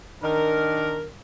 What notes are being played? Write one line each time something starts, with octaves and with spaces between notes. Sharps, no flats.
D#3 D4 A#4